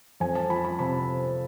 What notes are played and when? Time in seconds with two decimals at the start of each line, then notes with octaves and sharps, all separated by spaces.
0.20 F2 G#5
0.35 A5
0.50 F3 B5
0.65 B5
0.79 C3 B5